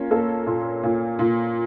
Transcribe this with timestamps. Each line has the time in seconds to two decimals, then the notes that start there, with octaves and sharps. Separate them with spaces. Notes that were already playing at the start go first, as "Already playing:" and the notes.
Already playing: A#3 C#4 F4
0.11 A#3 A4
0.47 A#2
0.83 A#2
1.19 A#2